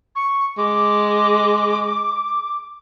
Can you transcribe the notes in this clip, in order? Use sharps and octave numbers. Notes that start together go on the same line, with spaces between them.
C#6
G#3 D6